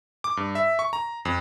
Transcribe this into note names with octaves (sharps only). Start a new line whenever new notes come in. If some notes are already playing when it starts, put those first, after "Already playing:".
D6
G2
E5
C#6
A#5
F2